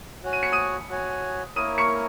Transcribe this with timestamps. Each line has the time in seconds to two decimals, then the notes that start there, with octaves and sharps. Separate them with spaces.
0.24 F#4 C#5 G#5
0.33 D#7
0.43 C#7
0.52 D#6 D#7
0.90 F#4 C#5 G#5
1.56 A#3 E4 A#4 C#5 D#6 D#7
1.78 C#6 C#7